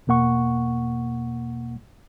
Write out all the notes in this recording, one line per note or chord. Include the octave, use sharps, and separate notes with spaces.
E2 B2 A#3 F#5 C#6